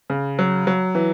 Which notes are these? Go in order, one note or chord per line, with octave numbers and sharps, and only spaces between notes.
C#3
F#3
F#3
E3